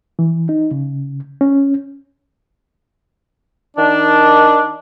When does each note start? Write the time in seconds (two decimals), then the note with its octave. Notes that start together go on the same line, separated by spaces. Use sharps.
0.19 E3
0.49 D#4
0.71 C#3
1.41 C#4
3.77 D#3 D4